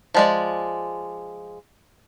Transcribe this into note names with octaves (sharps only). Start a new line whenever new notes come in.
F3 G#3 D5